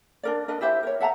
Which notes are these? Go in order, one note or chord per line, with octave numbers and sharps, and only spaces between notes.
D4 A#4 D5
D4 A#4 B4 D#5
E4 G4 C5 E5
A#4 C#5
E5 F#5 A5 A#5